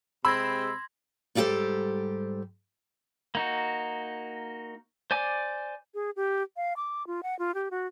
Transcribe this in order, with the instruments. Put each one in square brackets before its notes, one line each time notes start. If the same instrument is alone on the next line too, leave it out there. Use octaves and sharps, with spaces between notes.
[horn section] C3 G#3 C4 [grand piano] B5 [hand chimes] C6 G#6 A#6 [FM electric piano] E6
[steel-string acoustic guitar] G#2 G3 F4 G4 A4 C5
[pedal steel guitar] A#3 D#4 F#4
C5 D5 G#5 D6
[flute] G#4
G4
F5
D6
F4
F#5
F4
G4
F#4